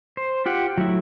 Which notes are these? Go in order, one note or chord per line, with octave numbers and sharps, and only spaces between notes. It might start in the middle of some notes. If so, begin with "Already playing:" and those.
C5
F4 G4 F#5
F#3 A3 E4